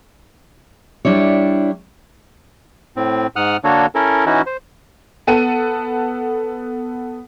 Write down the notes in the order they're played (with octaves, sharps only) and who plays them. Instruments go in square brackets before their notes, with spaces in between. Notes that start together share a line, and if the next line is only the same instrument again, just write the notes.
[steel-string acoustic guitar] G3 D4 E4 C#5
[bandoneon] A2 C4
G#2 F#5 D#6 F6 F#6
D3 A#3 D4 F#4 A4 C#5
C#4 E4 A4 A#4
E3 C#4 D#4 E4 F#4
C5
[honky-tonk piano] B3 A4 F#5 A5 D#7